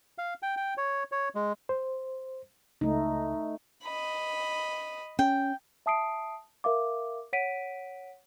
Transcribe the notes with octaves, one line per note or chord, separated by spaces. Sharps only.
F5
G5
G5
C#5
C#5
G#3
C5
C#2 A3 D#4
D#5 B5
C#4 G5
E5 A5 D#6 C7 D7
A#4 E5 F5 D6
C#5 F#5 B6 D7 D#7